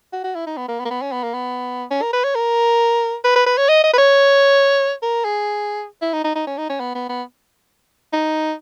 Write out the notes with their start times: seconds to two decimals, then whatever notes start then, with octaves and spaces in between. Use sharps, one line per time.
0.13 F#4
0.24 F#4
0.35 E4
0.47 D#4
0.57 B3
0.68 A#3
0.80 B3
0.85 A#3
0.91 B3
1.02 C#4
1.12 B3
1.23 A#3
1.34 B3
1.91 C#4
2.02 A#4
2.13 B4
2.24 C#5
2.35 A#4
3.24 B4
3.36 B4
3.46 B4
3.58 C#5
3.69 D#5
3.84 D#5
3.94 B4
3.98 C#5
5.02 A#4
5.25 G#4
6.02 E4
6.13 D#4
6.24 D#4
6.36 D#4
6.47 C#4
6.58 D#4
6.69 C#4
6.80 B3
6.95 B3
7.09 B3
8.13 D#4